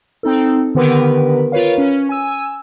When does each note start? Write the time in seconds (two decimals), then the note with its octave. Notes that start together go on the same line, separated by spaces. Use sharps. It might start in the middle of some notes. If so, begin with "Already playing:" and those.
0.23 C4 D#4 A4
0.75 D3 D#3 B3 G4 A#4 B4
1.52 F4 A#4 B4 C#5 F5
1.78 C#4
2.09 G#5 E6